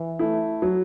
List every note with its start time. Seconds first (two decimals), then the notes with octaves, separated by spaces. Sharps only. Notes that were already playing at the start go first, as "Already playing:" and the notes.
Already playing: E3
0.19 A3 E4
0.62 F#3